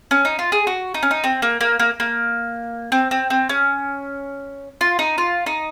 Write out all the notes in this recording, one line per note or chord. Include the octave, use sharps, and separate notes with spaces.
C#4
D#4
F4
G#4
F#4
D#4
C#4
D#4
C4
A#3
A#3
A#3
A#3
C4
C4
C4
C#4
F4
D#4
F4
D#4